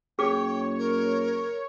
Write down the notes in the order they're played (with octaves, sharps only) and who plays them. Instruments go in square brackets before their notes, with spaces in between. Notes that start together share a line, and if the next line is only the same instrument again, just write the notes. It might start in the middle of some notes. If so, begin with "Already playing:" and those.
[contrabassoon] F#1 [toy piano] G#4 D6 [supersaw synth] C#5 [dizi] G5
[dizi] A#4